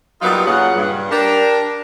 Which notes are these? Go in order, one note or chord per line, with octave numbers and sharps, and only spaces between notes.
F#3 G3 A#3 B3 D#4 F4
A#2 C#3 F#5
G2
D4 G4 A#4